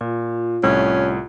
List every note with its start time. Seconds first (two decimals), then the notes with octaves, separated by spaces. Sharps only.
0.01 A#2 F4
0.63 C2 A2 C#4